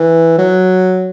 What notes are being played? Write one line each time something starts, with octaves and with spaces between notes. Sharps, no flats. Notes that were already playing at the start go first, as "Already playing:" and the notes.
Already playing: E3
F#3